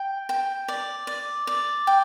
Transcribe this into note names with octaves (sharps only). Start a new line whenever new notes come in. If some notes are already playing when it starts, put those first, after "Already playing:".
Already playing: G5
G5
D5
D5
D5
G5